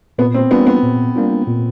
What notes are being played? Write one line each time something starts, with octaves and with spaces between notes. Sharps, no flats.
A#2 B3
C4
G3 A#3 B3 D4 F4
B3
A#2
G3 A#3 D4 F4
A#2